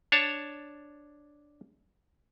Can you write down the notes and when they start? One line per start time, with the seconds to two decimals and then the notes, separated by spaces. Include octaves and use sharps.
0.12 D4 C#5 A5